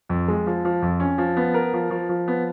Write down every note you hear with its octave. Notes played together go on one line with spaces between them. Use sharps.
F2
G#3
F3
F3
F2
C#4
F3
B3
A#4
F3
F3
F3
B3